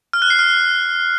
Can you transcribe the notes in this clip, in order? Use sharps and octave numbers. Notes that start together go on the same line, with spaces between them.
F6
F#6
C7
F6